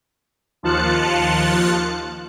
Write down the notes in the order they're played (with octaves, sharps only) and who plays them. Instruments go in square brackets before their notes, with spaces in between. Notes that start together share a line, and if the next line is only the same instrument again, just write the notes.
[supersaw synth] D#2 F3 F4 A5 F#6 C#7